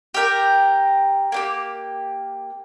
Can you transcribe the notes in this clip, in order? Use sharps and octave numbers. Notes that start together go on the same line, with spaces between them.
G4 A#4 G5
A#3 D4 G4